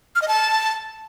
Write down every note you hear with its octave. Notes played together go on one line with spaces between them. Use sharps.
F6
D#5
A5